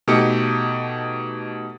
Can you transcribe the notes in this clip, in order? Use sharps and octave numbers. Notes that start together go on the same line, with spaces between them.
B2 A3 D#4 G4 C#7